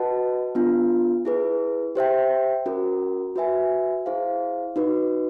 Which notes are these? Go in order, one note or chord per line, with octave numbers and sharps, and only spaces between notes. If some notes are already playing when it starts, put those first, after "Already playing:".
Already playing: F#4 B4 D#5 F#5 A5
B3 D4 F4
E4 G#4 B4
G4 C5 E5 G5
C#4 F#4 A#4
F#4 B4 E5 G#5
E4 G#4 C5 F5
D#4 F#4 B4